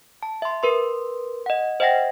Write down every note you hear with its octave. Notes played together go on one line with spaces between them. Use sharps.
A5
E5 C6
A#4 B4 C6
D#5 F#5
C5 D#5 E5 F#5 G5 A#6